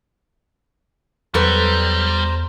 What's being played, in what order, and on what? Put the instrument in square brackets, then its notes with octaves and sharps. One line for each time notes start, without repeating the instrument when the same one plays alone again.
[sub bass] E2 [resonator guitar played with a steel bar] F#3 A4 B4 [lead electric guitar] G3 [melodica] C5 A#5